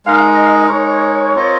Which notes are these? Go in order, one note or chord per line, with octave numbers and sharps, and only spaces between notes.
G#3 D#4 A#4 F5
D#5
F5
D#5
G#3 D#4 A#4 C#5
C4 F4 A#4 D#5